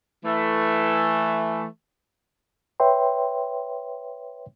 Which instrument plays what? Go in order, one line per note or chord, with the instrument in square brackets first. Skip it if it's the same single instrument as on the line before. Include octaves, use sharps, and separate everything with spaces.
[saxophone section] E3 A3
[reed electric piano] B4 C#5 E5 G5 C6